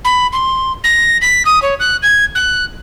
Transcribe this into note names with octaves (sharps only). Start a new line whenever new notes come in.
B5
C6
A#6
B6
D#6
C#5
F#6
G#6
F#6